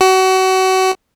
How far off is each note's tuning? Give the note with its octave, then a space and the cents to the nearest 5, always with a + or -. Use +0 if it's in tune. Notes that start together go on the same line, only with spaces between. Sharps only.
F#4 +30